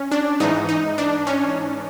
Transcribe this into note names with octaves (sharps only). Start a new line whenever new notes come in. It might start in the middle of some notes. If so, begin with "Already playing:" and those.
Already playing: C#4
D4
G#2 E3 D#4
D#4
D4
C#4